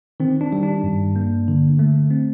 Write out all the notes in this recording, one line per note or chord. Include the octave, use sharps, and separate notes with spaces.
D#3 C4
D4
G3
D4
G2
A#3
D3
A3
C4